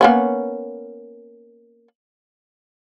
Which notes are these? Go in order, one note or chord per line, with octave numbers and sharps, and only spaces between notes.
A#3 B3 C#4